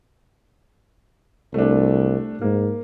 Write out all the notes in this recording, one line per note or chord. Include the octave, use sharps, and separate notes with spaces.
C2 A3 D4
G#2 A#3